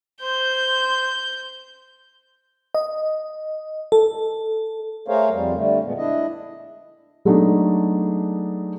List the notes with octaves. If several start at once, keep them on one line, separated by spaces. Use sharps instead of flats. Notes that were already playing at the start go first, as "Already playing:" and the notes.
C5 G6
D#5
A4
A3 G#4 A#4 C5 C#5 F5
F2 G3
D3 G3 A3
A#2 G#3 B3
D4 E4 D#5
F#3 G#3 A3 B3 D4 D#4